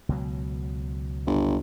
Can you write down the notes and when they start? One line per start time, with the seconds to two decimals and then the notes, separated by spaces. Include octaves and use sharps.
0.09 C#2 B2 F#3
1.26 G1